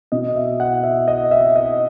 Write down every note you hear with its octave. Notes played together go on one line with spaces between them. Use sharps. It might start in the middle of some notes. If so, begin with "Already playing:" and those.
B2 D#5
E5
F#5
E5
D#5
E5
D#5